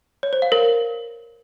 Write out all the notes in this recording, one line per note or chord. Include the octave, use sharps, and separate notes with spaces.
C#5
C5
F5
A#4